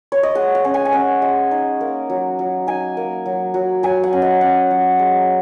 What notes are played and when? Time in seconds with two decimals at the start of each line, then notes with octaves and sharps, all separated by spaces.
0.12 C#5
0.23 D#5
0.35 G#3 F#5
0.55 F#5
0.64 C#4
0.74 G#5
0.85 G#5
0.93 C#4 F#5
1.22 G#3
1.51 D#4
1.81 A#3
2.10 F#3
2.39 F#3
2.67 D#4 G#5
2.97 A#3
3.26 F#3
3.54 F#3
3.83 F#3 G#5
4.04 F#5
4.13 C#4
4.22 D#5
4.41 C#4 F#5
4.71 F#3
4.99 G#3